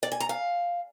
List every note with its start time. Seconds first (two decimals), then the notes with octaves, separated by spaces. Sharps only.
0.03 D5
0.12 G#5
0.20 A#5
0.29 F5